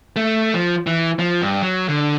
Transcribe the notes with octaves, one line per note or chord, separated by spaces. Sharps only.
A3
F3
E3
F3
G2
F#3
D3